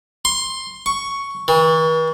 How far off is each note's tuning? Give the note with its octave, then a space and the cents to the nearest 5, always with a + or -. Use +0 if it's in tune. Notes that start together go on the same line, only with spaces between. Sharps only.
C6 +15
C#6 +5
E3 -45